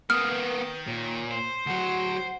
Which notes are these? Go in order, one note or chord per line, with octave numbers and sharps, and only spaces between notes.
C#3 A#3 B3 D#6 F6
D#3 B4
A#2 C#5
C5
D2 F#3 F#5